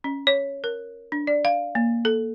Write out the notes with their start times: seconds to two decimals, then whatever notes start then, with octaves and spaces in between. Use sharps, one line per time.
0.04 C#4
0.27 C#5
0.64 A#4
1.12 D4
1.27 D5
1.45 F5
1.75 A#3
2.05 A4